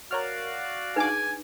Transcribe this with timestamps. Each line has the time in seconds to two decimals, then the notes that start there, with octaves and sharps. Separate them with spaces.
0.11 F#4 A#4 C#5 D5 F5 F6
0.96 D4 D#4 G#4 B4 G#5 D6